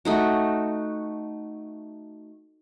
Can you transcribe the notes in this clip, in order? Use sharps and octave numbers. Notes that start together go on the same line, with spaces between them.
A3 D#4 F#4